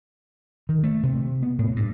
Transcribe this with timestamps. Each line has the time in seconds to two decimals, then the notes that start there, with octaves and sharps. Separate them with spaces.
0.69 D#3
0.84 A3
1.03 C3
1.42 B3
1.59 A2
1.76 G2